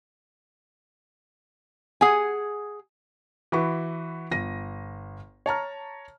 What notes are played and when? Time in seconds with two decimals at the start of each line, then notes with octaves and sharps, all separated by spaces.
2.01 G#4 F#5 G#5
3.52 E3 E4 F#4 B4 B5 C#6
4.31 G1 A#6 D#7
5.46 C#5 A5 A#5 F6